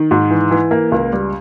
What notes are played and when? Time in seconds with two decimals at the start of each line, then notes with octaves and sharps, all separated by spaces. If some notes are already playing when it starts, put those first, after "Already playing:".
Already playing: D#3
0.11 G#2
0.30 E3
0.51 E3
0.71 A#3
0.92 C#2
1.13 G3